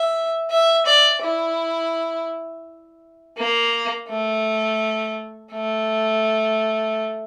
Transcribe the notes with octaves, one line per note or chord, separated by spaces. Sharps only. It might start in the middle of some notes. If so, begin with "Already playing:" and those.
Already playing: E5
E5
D5
E4
A#3
A3
A3